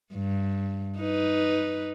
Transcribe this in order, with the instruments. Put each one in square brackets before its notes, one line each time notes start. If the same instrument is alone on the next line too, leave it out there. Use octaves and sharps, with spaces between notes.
[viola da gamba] G2
D#4 B4